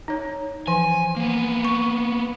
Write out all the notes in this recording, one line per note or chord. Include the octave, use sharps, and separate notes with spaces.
D#4 C#5
E3 F3 G#5
A#3 B3
C#6